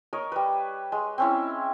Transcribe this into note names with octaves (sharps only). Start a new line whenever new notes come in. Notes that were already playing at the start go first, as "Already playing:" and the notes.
A#4 C#5 D#5
G3 B4
G#3
C4 C#4 E4